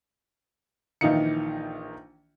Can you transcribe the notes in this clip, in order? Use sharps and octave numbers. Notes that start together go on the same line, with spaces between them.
A#1 D#3 E3 D#4 F5 C#7